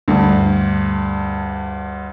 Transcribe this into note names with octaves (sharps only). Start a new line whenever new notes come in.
D2 G2